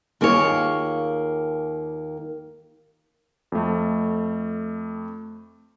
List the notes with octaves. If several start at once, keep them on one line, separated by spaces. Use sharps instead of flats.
D#2 A#3 F4 G#4 C#5
F2 A3